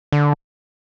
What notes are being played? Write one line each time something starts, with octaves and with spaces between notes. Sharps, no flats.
D3